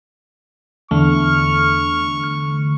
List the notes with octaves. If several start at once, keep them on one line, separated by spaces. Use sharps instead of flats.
E2 D3 A3 C#6 F6